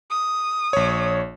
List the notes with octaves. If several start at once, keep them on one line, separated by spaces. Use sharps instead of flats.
D#6
A#1 C#5